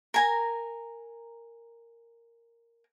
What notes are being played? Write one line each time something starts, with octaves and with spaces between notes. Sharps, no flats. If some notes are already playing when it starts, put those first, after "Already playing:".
A#4 G#5 A#5